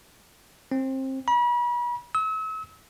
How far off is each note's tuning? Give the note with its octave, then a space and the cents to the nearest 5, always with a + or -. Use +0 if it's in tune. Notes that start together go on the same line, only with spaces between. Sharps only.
C4 +25
B5 -40
E6 -40